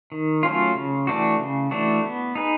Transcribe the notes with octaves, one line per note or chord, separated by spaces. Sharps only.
D#3
F#3 A3 C#4 F4
C#3
E3 A3 D4 F#4
C#3
E3 A3 D4 F#4
B3
D#4 G#4 B4